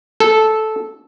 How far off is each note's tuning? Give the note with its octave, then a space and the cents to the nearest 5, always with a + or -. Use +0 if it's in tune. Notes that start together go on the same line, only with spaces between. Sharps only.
A4 -10